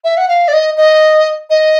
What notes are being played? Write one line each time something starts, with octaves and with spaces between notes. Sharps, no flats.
E5
F#5
F5
D5
D#5
D#5
D#5